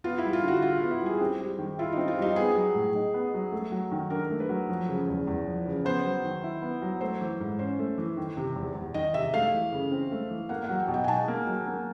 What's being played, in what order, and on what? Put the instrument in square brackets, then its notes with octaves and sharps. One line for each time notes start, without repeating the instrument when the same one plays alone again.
[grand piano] B3 [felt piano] F4
[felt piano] E4
[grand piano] G3
[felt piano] F4
[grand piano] D3
[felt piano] F#4
[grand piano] E4 [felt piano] F4
[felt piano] F4
[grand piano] B3
[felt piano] E4
[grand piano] G3 [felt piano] G#4
[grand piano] C4 [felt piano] G4
[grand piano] G3
D#3
[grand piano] E4 [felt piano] F4
[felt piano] D#4
[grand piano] C4
[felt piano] F4
[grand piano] G3 [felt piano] D#4
[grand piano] B3 [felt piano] G#4
[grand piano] F#3
A2
D#4
B3
F#3
A3
F#3
D#3
[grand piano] D4 [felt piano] A#4
[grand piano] A3
[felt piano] B4
[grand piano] F#3
F3
C#3
E2
E2
F3
C#3
[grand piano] B3 [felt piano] C5
[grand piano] F#3
D#3
E4
B3
F#3
[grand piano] A3 [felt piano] C5
[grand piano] E3
G#2
[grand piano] C#4 [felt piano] C5
[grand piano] A3
E3
D#3
C3
E2
E2
[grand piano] D#3 [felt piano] D#5
[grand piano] C3 [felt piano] E5
[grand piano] A3 [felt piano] F5
[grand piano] E3
C#3
C4
A3
E3
[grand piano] A#3 [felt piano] F#5
[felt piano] F#5
[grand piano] F#3
[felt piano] G5
[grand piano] B2
[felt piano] G5
G#5
[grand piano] D#4 [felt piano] A5
[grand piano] A#3
F#3
A#3